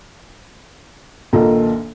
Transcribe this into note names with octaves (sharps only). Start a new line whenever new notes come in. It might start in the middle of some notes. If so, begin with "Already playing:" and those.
A#1 A#2 D#3 F4 A4 A#5